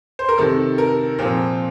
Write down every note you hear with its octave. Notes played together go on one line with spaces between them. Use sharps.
C5
A#4
C3 D#3 A4
A#4
A#2 F3 C4